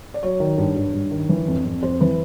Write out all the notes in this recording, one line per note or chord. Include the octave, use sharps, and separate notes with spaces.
D5
F#3 C#5
D#3
G2
G2
G2
D#3
E3
F2
F2
F2 C5
E3 B4